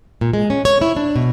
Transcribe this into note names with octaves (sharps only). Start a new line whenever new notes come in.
A#2
G#3
C#4
C#5
E4
D4
B2